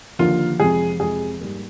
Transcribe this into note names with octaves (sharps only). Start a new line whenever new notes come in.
D#2 D3 F3 A#3 F4
F2 C3 F3 G#3 G#4
F2 C3 F3 G#3 G#4
G#2 G3 A#3